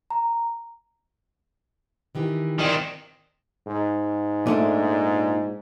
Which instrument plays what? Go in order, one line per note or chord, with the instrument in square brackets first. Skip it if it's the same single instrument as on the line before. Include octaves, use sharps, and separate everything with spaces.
[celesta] A#5
[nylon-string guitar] D#3 E3 G4
[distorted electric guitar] D#3 C4 [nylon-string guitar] E3 D5
[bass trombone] G#2
[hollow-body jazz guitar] A#2 A3 D4